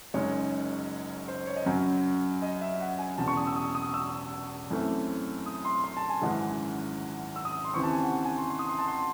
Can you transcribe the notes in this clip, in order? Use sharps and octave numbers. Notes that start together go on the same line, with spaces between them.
F#1 F#2 C#3 G#3 D#4 C#5
C5
C#5
D#5
F#2 C#3 F#3 C#4
D#5
E5
F#5
G#5
E1 E2 C#3 A5
C#6
D#6
E6
D#6
D#6
E6
F#2 E3 A3 C4
D#6
C6
C6
A5
G#5
G#1 F#2 C#3 E3 G#3 F#5
E6
D#6
C6
D#2 C#3 E3 C4 C#6
A5
G#5
F#5
G#5
C6
C6
D#6
C6
A5
C6